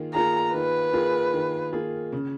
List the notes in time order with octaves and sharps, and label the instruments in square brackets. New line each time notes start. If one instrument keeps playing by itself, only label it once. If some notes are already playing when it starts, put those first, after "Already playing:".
Already playing: [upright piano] D#3 A#3 F4 G#4
[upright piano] A#3 F4 G#4 [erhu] A#5
[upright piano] D#3 [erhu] B4
[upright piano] A#3 F4 G#4
D#3
A#3 F4 G#4
C#3